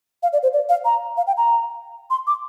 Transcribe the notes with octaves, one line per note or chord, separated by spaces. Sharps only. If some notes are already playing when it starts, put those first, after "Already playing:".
F5
D5
C5
D5
F5
A#5
F5
G5
A#5
C6
D6